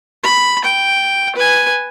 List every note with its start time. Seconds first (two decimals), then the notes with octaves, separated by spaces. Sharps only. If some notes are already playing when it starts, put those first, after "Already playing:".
0.23 B5
0.65 G5
1.36 B4 G#5